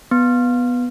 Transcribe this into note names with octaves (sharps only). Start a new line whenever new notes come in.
B3